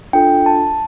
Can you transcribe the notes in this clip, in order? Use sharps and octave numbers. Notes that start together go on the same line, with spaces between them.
D4 F4 A4 G5
A5